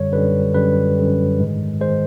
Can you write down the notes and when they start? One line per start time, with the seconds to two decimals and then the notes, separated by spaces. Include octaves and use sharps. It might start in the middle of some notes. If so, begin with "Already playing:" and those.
Already playing: F#2 D3 G3 C#5
0.12 F#2 D3 G3 B4
0.54 F#2 D3 G3 B4
0.97 F#2 D3 G3
1.39 G#2 D#3 G#3
1.81 D#3 G#3 C5